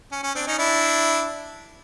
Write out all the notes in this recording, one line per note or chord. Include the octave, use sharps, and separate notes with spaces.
C#4
C#4
C4 D4
C#4 D#4
D4 E4